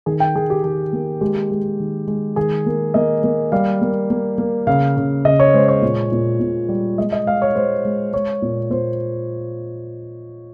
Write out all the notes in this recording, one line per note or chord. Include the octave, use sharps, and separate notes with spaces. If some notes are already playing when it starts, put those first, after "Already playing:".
D#3 G#4
G5
D#3 G#4
G4
D#3 G#4
A#3
G#3 G4
G#3
D#3
G#3
D#3 G#4
A#3
A#3 D#5
A#3
G3 F5
A#3
A#3
A#3
C#3 F5
C#3
C#3 D#5
C#5
G#3 C5
C#5
A#2
A#2
A#2
G3
G#3 D#5
D#5
G#3 F5
C#5
G#3 C5
G#3
G#3 C#5
A#2
A#2 C5